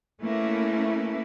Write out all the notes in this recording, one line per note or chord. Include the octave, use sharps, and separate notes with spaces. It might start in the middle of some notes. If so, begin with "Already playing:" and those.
A3 A#3 C#4 E4 B4